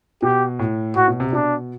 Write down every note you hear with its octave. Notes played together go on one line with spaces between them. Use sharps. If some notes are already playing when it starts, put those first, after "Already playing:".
B2 G4
A2
A2 F#4
B2
C3
B2 D4